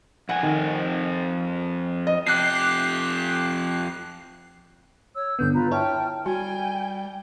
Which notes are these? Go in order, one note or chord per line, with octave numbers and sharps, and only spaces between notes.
F2 C4 F#5 G#5
D#3
D#5
F2 G4 F#6 C7
C#5 E6
G2 D3 B3 G6
F4 B4 A#5
E4 C#5 G5 A5 F6
G3 F#4 G5 G#5